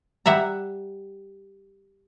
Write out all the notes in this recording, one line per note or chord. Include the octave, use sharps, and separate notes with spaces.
G3 E5 F#5 A#5